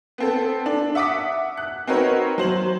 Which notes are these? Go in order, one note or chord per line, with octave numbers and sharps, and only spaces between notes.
B3 C4 A4
D4
E5 F#5 D6 D#6 B6
F#6
C4 D#4 F#4 A#4 B4 C#5
F#3 C5 F#7